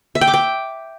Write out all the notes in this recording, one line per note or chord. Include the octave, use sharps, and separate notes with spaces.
E5
G5
D6
G5